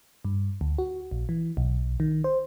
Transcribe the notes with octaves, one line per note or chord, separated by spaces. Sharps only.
G2
D2
F#4
A#1
E3
B1
D#3
C5